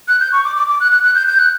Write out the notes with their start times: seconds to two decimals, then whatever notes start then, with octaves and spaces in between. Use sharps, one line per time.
0.08 F#6
0.20 G6
0.33 C#6
0.45 D6
0.56 D6
0.68 D6
0.80 F#6
0.92 F#6
1.03 F#6
1.15 G6
1.27 G6
1.39 F#6